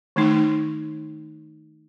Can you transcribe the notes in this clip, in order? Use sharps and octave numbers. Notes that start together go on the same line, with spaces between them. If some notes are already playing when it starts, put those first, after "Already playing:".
D#3 A3 D#4